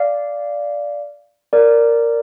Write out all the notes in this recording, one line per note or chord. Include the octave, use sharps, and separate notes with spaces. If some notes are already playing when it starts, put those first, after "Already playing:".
Already playing: D5 F5
A#4 D5